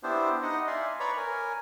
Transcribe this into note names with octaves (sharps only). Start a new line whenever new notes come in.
B3 D4 E4 G4 C5
D#4 D#5 F#5
D5 E5 F5 G#5 C6
B4 C#5 D5 A#5 B5 C#6
A#4 G#5